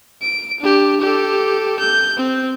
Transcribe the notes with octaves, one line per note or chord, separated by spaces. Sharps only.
D7
D4 G4
G4 A4
G6
C4